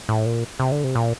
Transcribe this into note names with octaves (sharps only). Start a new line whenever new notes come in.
A2
A#2
C3
D3
C3
A#2